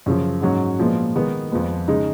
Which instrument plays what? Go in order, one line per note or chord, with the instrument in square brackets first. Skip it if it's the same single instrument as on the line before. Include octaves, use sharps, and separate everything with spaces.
[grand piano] F#2 C#3 F3
G#2 F#3 C#4
A#2 F3 G#3 B3
D#3 G#3 B3 D#4
F2 F3 G#3 B3
C#3 G#3 D#4